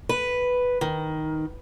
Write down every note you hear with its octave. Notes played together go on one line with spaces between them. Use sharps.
B4
D#3